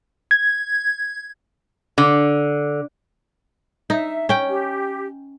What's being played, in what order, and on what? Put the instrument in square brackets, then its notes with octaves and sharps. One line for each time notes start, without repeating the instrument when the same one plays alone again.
[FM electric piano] G#6
[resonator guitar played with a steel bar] D3
[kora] D#4 [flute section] E5
[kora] C#4 G5
[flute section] G4